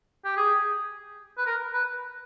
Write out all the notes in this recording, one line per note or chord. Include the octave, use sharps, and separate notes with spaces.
G4
G#4
B4
A#4
B4